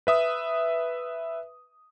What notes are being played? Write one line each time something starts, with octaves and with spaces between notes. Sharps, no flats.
B4 E5 D#6